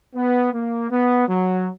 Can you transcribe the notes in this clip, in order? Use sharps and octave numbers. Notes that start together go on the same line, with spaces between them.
B3
A#3
B3
F#3